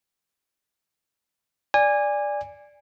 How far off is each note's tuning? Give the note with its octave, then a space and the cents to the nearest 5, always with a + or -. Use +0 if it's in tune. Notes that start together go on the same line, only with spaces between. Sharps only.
D5 +0 G#5 -20